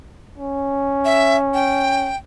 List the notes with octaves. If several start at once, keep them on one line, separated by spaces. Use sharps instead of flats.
C#4
E5
G5